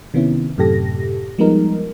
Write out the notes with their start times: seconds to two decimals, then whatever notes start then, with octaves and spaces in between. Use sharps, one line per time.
0.14 C3 D#3 B3 C#4 E4
0.58 F#2 A2 C3 G4 A4 A#6
1.38 F3 G3 G#3 B3 D#4 A#4